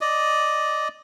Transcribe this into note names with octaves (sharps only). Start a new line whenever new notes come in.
D5 D#5